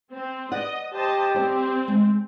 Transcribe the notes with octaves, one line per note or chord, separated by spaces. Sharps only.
C4
B4 D5 D#5 F#5
G4 C5 D#5 A5
G3 C4 C5
G#3